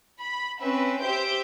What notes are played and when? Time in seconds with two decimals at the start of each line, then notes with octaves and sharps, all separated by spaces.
0.20 B5
0.62 C4 C#4 B4 E5
1.03 G4 C5 E5 G6 D7